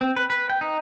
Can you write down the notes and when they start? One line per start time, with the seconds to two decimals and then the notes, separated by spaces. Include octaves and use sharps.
0.01 C4
0.16 B4
0.30 B4
0.50 G5
0.61 D#4